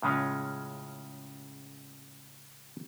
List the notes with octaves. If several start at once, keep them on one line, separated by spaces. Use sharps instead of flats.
A2 C#3 G#3 C#4 F4